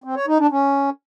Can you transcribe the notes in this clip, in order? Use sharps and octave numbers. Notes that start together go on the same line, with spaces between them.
C4
C#5
D#4
D4
C#4